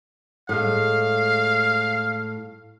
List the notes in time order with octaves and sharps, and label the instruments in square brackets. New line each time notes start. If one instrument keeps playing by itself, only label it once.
[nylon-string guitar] A2 G#3 [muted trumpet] F5